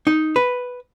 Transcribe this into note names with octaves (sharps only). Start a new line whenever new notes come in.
D#4
B4